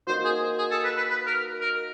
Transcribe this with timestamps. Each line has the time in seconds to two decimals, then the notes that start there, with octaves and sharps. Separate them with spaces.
0.07 A#3 D#4 F#4 C5
0.25 G#4
0.58 G#4
0.71 A4
0.84 B4
0.97 B4
1.10 B4
1.26 A#4
1.61 A#4